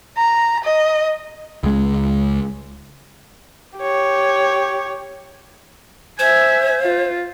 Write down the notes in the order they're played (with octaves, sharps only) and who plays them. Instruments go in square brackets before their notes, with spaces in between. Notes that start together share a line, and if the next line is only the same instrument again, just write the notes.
[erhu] A#5
D#5
[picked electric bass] C#2 G#3
[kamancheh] G4 C#5
[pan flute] C5 [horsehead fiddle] E5 G#5
[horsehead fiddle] F4